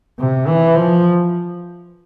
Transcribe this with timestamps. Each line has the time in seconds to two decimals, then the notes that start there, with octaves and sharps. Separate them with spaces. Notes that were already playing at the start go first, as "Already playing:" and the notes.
0.19 C3
0.48 E3
0.76 F3